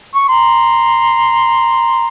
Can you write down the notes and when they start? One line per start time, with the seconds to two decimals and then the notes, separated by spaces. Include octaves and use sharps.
0.15 C#6
0.29 A#5 C6